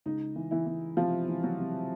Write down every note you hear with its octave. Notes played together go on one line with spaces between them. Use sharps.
C#2 D#4
E3
E3 E4
E3
C3 F3 F4
E3
F#3 F#4
C3